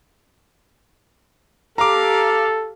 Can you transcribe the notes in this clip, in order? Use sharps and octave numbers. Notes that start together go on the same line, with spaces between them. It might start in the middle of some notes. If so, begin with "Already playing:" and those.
G4 A4 F5 A#5 D6